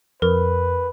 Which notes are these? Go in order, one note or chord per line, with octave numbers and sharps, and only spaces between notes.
F2 A#4 B4